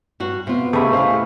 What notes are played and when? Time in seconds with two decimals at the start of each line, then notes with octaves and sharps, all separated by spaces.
0.20 G2 F#4
0.47 C3 B3 F4
0.73 C#2 C3 A3 G#4 B5
0.93 E2 G#2 C5 F5